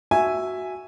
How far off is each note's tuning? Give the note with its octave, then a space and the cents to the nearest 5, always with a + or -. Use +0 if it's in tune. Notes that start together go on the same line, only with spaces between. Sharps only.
F#4 +0 E5 +0 G#5 -5